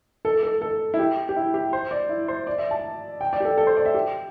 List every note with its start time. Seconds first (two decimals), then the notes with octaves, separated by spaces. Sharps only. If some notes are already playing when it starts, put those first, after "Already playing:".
0.25 A4
0.43 A4
0.61 A4
0.94 E4
0.99 G4
1.29 G4
1.36 E4
1.54 G4
1.73 C5
1.91 D5
2.09 E4
2.28 C5
2.47 D5
2.58 E5
2.71 A5
3.21 G5
3.33 D5
3.40 G4
3.45 A4
3.58 A4
3.67 C5
3.77 D5
3.86 E5
3.94 G4